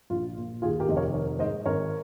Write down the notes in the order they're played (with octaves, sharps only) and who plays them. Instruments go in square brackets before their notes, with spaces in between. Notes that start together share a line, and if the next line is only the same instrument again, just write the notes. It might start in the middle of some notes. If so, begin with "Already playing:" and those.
[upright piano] A#1 F4
A#2
D#2 F4 G#4
G4 A#4
F1 D#5
A#4 C#5
D#3 A#4 C#5
G#2 C5 D#5
G#1 A#4 C#5